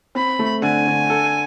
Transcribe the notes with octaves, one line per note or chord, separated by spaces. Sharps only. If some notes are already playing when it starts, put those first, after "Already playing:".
C4 B5
A3
D3 G#5
D3
A4